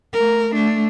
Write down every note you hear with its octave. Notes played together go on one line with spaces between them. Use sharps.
A3 A#4
A3 D4